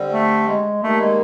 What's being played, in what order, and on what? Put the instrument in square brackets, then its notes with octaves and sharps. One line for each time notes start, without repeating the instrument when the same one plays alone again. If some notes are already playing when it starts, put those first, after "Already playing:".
Already playing: [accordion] D3 G3 C4
[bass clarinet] A3
G#3
[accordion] D#3 G3 A#3 [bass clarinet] A3
[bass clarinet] G#3